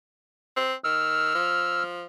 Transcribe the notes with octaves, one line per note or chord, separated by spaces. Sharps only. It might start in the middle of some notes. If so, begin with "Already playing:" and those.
C4
D#3 E6 F6
F3